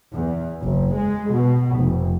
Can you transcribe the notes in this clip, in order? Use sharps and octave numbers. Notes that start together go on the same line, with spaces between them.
E2
F#1
G#3
B2
F1